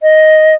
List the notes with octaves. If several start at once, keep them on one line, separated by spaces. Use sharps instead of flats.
D#5